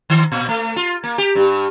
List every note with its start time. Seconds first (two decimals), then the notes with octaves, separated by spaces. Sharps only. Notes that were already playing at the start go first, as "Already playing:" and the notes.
0.10 D#3
0.32 A#2
0.49 A3
0.76 F4
1.04 A#3
1.18 G4
1.35 G2